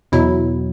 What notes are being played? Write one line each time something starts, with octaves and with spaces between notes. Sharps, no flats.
E2 B2 F#3 E4